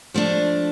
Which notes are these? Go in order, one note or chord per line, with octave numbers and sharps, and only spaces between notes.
F3 A3 D4